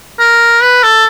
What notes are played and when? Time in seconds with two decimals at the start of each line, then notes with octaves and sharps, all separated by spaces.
0.19 A#4
0.62 B4
0.83 A4